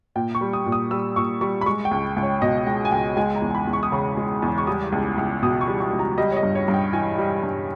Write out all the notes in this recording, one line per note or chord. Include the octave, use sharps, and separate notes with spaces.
A#2 G5
C#6
G3
D#6
A#2
D#6
G3 E6
A#2 C#6
G3 C#6
B5
G#3 C#6
G5
C#2
C#2
C#5
B2 D#5
G#3 G5
G#5
C#2 G5
G#3 G#5
A#5
E2
B5
E2
C#6
D#6
C#3 C#6
G#3
E2
C#6
G3 D#6
C#2
C#2
B2 D#6
C#6
G3
C#6
C#2
A#5
G3 D#5
C#5
D#5
G2
C#5
G2
G5
E3 G#5
G3
G2